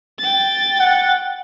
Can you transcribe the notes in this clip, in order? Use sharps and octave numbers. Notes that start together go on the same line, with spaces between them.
G5 A6
F#5